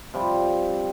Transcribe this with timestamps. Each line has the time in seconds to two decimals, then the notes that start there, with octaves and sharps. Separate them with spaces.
0.14 C3 F3 G3